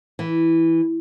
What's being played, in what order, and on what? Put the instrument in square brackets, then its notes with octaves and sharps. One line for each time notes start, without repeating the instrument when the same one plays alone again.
[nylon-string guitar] E3